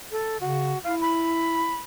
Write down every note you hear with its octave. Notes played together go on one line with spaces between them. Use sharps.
A4
C#3 F#4
E4 F5
B5